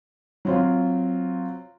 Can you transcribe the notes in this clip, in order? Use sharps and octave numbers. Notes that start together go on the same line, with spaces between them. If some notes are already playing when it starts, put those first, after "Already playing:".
F#3 C4 F4